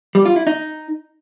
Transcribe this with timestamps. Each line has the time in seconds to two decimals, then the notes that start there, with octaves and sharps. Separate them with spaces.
0.15 G3
0.25 F4
0.36 E4
0.47 D#4